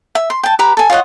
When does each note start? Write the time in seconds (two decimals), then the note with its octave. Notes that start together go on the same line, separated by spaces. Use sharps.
0.15 E5
0.30 C6
0.43 G5 A5
0.59 G4 B4 A#5 B5
0.77 A4 G#5
0.90 F4 C#5 D#5 F#5